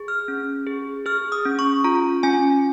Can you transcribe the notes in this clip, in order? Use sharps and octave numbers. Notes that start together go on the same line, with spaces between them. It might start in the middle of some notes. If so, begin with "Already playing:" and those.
Already playing: G#4
F6
C#4
G#4
G#4 F6
D#6
C#4
C#6
F4 A#5
C#4 G#5